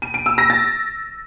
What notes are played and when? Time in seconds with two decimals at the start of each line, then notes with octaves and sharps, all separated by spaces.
0.02 D#7
0.14 D7
0.26 E6
0.38 A#6
0.50 A6